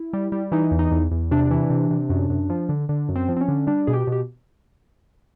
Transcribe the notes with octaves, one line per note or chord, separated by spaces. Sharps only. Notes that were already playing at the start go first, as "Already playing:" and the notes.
Already playing: E4
G3
G3
E3 D#4
E2
D#4
E2
E2
C3 D4
E3
C3
C3
F#2
F#2
F3
D3
D3
F#2
C4
F3
C4
C#4
D3
G3 D4
B2 G#4
G4
B2 G4